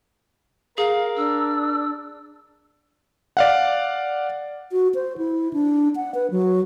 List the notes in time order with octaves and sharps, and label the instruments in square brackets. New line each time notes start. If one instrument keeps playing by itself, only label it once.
[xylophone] G#4 [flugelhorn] A#4 [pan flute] F5
[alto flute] D4 [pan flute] E6
[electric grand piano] D5 F5 F#5
[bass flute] F#4
C5
E4
D4
F#5
B4
F#3